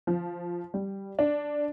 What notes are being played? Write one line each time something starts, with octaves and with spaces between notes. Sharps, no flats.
F3
G3
D4